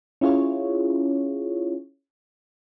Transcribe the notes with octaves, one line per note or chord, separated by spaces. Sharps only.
C#4 E4 F4 G#4 C#5